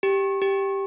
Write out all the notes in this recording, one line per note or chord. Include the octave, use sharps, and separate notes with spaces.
G4
G4